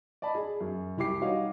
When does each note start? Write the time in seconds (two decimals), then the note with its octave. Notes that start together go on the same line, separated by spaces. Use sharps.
0.22 D5 D#5 A5 B5
0.35 G#4
0.60 F#2
0.97 C2 E4 G4 D6 C7
1.21 G3 D#4 F#4 C#5 D#5 F5